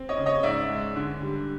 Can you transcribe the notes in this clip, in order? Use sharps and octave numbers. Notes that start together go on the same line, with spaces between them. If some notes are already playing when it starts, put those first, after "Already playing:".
Already playing: C4
C#5 D#5
C#3
C#5 D#5
G#2 D5 E5
G#3
D3
G3